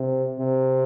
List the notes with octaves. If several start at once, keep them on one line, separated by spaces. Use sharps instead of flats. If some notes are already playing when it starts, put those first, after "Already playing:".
Already playing: C3
C3